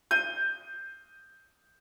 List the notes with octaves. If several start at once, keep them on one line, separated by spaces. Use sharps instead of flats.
G6 D#7